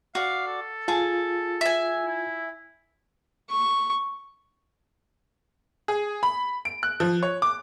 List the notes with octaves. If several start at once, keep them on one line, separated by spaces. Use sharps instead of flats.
F#4 D5 F5
A4
F4 G#4 A5
E5 G#5
E4
C#6
G#4
B5
D7
F#6
F3
C#5
D6